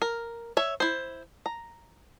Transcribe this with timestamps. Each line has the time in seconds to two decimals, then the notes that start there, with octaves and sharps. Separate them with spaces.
0.02 A#4
0.57 C#5 E5
0.80 E4 C5
1.46 A#5